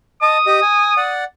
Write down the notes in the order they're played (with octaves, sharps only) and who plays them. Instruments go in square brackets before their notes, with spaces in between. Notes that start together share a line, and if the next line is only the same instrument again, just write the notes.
[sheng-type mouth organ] D#5 A5 [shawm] D#6
[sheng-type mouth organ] G4 D#5
G#5
D5 F#5